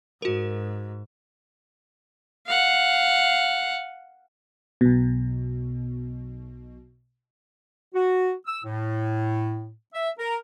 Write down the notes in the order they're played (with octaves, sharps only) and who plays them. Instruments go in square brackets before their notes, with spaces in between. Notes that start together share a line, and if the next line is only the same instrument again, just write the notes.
[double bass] G#2 [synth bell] F#4 A#4
[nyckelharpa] F5 F#5
[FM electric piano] B1 B2
[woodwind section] F#4
E6
A2
E5
A#4